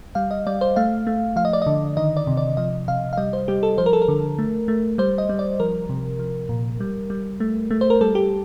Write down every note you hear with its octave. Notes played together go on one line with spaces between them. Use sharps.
G3 F5
D#5
G3 D5
C5
A3 F5
A3
F3 F5
D#5
D5
D3 D#5
D#3 D#5
D5
C3
D5
F3 D#5
C3 F5
F5
G3 D#5
C5
G3 G4
A4
F3 C5
A#4
A4
A#4
D3
A3
A3
G3 C5
D#5
G3
D5
F3 A#4
C3
F3
A#2
G3
G3
A3
A3
C5
A#4
G3 A4
G4